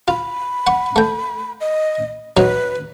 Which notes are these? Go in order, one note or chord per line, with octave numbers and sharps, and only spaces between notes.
F4 B5
F#5 C#6
A3 G5
D#5
F#3 D#4 B4 D#5